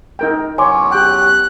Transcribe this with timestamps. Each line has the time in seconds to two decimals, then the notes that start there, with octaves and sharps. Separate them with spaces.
0.19 D#4 A#4 G5
0.58 E2 F#3 C#4 C#5 G#5 C6 D6
0.91 G4 G5 F#6